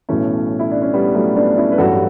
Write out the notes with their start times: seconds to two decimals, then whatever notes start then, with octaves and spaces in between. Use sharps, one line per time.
0.09 B1 A2 E3 A3 C#4
0.59 E4
0.71 D4
0.82 C#4
0.93 G3 B3
1.15 F#3 A3
1.36 B3 D4
1.56 C#4 E4
1.72 B4
1.78 A1 G2 F#3 F#4 A4